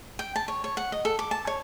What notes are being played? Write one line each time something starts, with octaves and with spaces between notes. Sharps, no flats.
G5
A5
C#5
C#5
F#5
D#5
A4
D6
A5
C#5